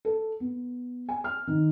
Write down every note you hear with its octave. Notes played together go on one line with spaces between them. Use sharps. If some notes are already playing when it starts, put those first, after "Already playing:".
A4
B3
G#5
F6
D#3